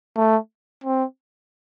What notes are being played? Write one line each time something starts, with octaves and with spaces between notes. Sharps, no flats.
A3
C4